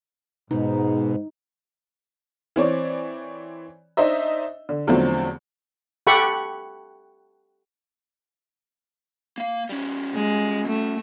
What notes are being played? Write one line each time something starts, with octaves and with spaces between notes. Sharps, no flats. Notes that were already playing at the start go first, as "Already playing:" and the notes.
G#2 B2 D#4
E3 C4 C#5 D5
D4 D#4 C5 D#5 E5
D3
E2 D3 F3 F#3 A3 C4
G4 A4 F#5 B5 C#6
A#3 F5
G3 C#4
G#3
A3